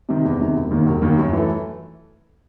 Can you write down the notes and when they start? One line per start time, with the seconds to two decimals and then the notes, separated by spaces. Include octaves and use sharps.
0.09 C3 D#3
0.25 E2
0.41 C3 D#3
0.56 E1
0.71 D#2 D#3
0.86 E1
1.02 D#2 D#3
1.18 F#2
1.33 E3 A3